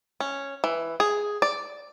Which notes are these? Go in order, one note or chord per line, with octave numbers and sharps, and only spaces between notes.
C#4
E3
G#4
D5